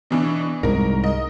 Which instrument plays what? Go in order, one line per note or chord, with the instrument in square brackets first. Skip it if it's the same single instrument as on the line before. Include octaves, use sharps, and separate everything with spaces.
[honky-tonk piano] B2 E3 D4
[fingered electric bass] C2 G#2 [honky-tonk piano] A#4
[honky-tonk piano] D#5